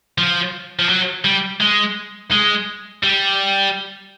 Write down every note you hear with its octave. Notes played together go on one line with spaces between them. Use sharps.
F3
F3
F#3
G3
G#3
G#3
G3